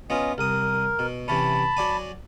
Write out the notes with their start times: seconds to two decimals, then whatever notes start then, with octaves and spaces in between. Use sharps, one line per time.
0.10 B3 C#4 F4 D#5
0.38 C2 A#4 D#6
0.99 B2
1.28 C3 E3 C#4 A5 B5
1.77 F#3 D5 G#5